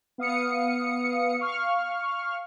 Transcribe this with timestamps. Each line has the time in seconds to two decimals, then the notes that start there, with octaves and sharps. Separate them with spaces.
0.18 B3 F5 D#6 C#7
1.39 F5 C#6 F6